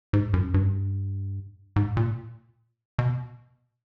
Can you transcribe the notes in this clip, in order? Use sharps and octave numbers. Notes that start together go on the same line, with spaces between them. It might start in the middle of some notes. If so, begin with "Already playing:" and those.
G#2
F#2
G2
G#2
A#2
B2